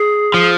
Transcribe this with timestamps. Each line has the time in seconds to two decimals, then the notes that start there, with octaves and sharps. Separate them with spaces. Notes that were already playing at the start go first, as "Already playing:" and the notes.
Already playing: G#4
0.34 F3